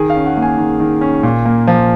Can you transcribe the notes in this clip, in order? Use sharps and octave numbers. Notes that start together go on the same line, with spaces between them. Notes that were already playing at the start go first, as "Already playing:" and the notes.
Already playing: D#3 G#4
F5
C#4
F#5
A#3
G#5
D#3
D#3
C#4
A#2
A#3
F3